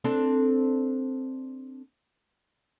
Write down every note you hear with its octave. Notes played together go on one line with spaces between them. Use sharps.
C4 D4 A4